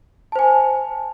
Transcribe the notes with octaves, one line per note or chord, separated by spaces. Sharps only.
C5 G#5 A5